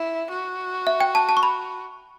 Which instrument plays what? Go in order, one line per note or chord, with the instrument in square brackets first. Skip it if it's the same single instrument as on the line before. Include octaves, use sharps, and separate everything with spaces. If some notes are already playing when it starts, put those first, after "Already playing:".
Already playing: [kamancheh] E4
F#4
[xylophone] E5
G5
A5
A5
C#6
B5